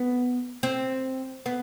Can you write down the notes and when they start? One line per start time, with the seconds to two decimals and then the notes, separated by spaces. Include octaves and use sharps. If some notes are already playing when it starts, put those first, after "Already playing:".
Already playing: B3
0.63 C4
1.46 B3